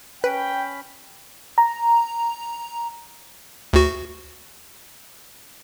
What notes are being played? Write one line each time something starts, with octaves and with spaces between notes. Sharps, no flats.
C#4 B4 G5 B5
A#5
D2 F#4